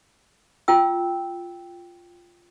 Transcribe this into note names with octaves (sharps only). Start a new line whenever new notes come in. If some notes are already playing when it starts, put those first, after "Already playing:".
F4 G5 E6